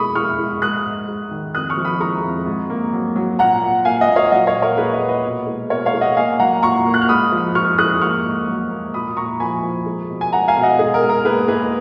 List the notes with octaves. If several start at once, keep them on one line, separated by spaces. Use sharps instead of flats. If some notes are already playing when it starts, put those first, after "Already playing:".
Already playing: B2 G#3 B5 C#6 D#6
G#3 C#6 F6
G#3
G#2 D#6 F#6
G#2
G#2
D#3
F2 D#6 F#6
C#6 F6
F3
B5 D#6
G#3 A#5 C#6
F2
G#2
A#3
F#3
F#3
A#2 F#5 A#5
A#2
A#2 F5 G#5
D#5 F#5
A#2
C#5 F5
F#3 D#5 F#5
C#5 F5
A#2
A#4 C#5
A#2 G#4 B4
B4 D#5
A#3
B4 D#5
B2
G#3
B2 A#4 C#5
C#5 F5
G#3
D#5 F#5
A#3 F5 G#5
F#3 F#5 A#5
A#2 A#5 C#6
A#3
F#6
F6
G#2 B5 D#6
F3
F3 C#6 F6
G#3 D#6 F#6
A#3 C#6 F6
G#2
F#3
A#3
A#2 B5 D#6
A#2 A#5 C#6
F3 G#5 B5
F3
G#3
B2
G#5
B2 F#5 A#5
F5 G#5
B2
D#5 F#5
G#2 G#4
A#4
G#2
A#4
A#3 G#4 B4
G#2 G#4 B4